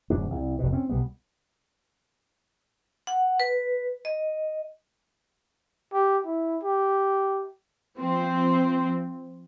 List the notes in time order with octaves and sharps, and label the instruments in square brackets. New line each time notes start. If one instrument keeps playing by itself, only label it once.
[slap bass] D1 F#2 D4
C2
F1 B2
C4 C#4
B1 G3 B3
[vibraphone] F#5
B4
D#5
[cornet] G4
E4
G4
[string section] F3 C4